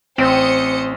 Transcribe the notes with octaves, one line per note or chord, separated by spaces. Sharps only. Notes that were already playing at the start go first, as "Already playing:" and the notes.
A1 C4 C5 D#6 C#7